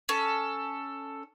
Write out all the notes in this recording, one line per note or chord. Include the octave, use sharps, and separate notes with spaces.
C#4 A4